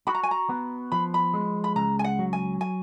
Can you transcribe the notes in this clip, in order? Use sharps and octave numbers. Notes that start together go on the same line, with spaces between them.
F#4 B5
A#5
G#5
A#5
B3
F3 B5
B5
G#3
B5
C#2 A#5
G#5
F#5
F#3
G#5
G#5